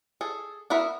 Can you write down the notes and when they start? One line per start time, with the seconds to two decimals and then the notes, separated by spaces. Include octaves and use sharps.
0.21 G#4 A4
0.70 B3 E4 F#4 A#4 E5